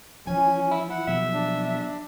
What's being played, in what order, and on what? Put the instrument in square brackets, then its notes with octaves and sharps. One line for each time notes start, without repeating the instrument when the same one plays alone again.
[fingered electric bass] E3 F3 [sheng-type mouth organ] C#4 [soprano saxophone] G#5
[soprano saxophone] E4
[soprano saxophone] E4 [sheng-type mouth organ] F#5
[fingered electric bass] B2 F3 F#3 [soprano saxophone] E5
[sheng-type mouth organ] D4